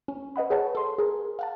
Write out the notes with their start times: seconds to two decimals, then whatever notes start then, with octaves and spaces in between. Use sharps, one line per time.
0.08 C#4
0.36 B4 D#5 F#5 B5
0.50 G#4 B4 C#5 F#5 A5
0.75 A4 C6
0.98 G#4 A#4
1.39 F5 F#5 A5